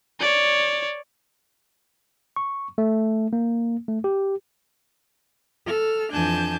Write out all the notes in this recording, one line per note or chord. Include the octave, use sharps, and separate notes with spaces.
C#5 D5
C#6
A3
A#3
A3
G4
A4 F6
F2 E3 D4 G#5 A5 G6